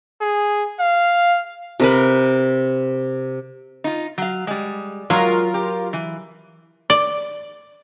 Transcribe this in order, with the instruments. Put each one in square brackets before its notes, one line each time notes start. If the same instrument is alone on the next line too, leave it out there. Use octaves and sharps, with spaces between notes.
[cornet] G#4
F5
[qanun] C3 A#4 B4
[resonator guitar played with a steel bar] D#4 F4
F#3 F5
G3 G#3
[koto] F#3 [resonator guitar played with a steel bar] G#3 [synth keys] F4 A#4
[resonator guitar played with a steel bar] G4
E3
[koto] D5